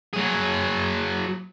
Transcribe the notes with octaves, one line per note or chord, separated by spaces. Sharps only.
F#3 G#4